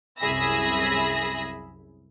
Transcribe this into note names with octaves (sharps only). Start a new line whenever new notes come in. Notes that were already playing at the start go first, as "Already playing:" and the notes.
C2 F#2 G#4 E5 B5 A#6